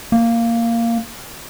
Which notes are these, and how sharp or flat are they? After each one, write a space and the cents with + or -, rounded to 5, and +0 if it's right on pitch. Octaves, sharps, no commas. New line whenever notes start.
A#3 -10